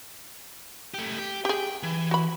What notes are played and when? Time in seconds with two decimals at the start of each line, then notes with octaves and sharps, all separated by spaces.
0.94 A3 G4
1.19 G4
1.45 G4 G#4 G5
1.83 E3
2.11 F#4 B5